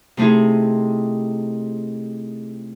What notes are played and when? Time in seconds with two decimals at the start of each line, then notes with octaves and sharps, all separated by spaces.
0.17 C3 A3 D#4 E4 G#4